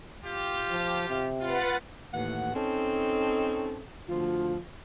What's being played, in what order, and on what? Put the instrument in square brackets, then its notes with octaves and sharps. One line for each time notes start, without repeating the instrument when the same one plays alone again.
[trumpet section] F4 G4
[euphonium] F3
C3
[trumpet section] F4 [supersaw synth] B4 F#5 A6
[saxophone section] D#2 A2 E3 F#5
C4 C#4 D#4 A4
D2 F3 F4